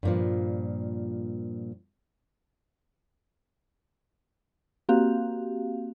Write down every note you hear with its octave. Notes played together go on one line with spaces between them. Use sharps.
G2 A#2 F3
A#3 C4 F#4 G4 F5